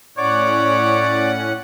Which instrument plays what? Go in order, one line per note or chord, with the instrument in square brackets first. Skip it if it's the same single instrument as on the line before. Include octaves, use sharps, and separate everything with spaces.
[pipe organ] A2 C#4 F#5 [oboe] C#5 [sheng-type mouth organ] D5 D6